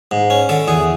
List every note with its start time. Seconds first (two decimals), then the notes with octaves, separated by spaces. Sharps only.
0.11 G#2
0.30 C#4
0.49 D3 A4
0.68 E2 G#4